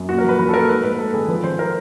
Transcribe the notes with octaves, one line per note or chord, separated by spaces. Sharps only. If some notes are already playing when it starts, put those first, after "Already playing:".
Already playing: F#2
A#2 F#4
A#4
F3 B4
F3 B4
A4
A#2 A#4
G#2 B4
G#2 B4
G#2 A4
D#3 G#4
F3 B4
F3 C5
A#4